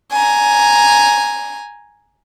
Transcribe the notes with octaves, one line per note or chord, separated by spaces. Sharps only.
G#5 A#5